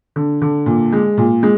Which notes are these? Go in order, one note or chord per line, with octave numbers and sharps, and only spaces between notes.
D3
D3
A#2
G#3
A#2
G#3